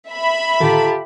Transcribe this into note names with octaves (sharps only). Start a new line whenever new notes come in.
E5 B5
A2 D3 D#3 F4 G4 A4 A5 A#5